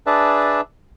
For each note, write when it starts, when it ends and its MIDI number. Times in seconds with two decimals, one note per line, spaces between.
0.07 0.61 62
0.07 0.61 68
0.07 0.61 71
0.07 0.61 74
0.07 0.61 76
0.07 0.61 81